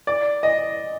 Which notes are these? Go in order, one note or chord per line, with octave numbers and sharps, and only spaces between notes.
D5
D#5